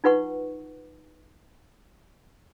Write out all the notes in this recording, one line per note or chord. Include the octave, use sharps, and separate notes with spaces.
D#4 F4 B4 F#5 C#6